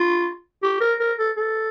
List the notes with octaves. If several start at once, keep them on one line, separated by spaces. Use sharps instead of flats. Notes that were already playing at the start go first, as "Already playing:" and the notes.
Already playing: F4
G4
A#4
A#4
A4
A4